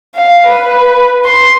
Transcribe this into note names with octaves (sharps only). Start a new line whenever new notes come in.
F5
B4
C6